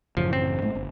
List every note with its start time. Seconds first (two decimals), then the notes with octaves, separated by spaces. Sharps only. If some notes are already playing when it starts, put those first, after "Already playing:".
0.17 A1 F#2 C#3 F3
0.33 C4
0.62 G#2 G#3 A3
0.75 G1